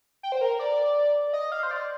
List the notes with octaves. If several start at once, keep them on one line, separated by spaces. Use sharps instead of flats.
G5
C5
A#4
D5
D#5
F5
C5
D5